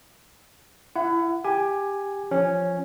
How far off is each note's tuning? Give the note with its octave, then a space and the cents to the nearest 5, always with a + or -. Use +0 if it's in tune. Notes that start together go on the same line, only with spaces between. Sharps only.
E4 +30 F#5 +0
G4 +15 G#5 +0
F3 +0 C#4 +0